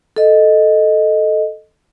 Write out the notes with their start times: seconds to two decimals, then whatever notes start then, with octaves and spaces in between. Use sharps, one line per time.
0.16 A4 D#5